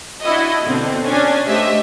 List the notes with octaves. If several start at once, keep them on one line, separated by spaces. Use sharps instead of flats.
D4 E4 F#4 D#5
B2 D3 C4
C#4 D4 G#5
A3 G4 C5 D#5 E5